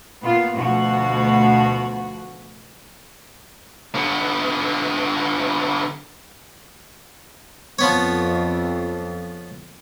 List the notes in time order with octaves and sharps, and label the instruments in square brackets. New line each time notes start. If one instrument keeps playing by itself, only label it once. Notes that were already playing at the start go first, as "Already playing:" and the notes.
[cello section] A#2 B3 F4
D2 B2 F3 F#4
[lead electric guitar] D3 B3
[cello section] F2 [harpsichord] F3 B3 C#5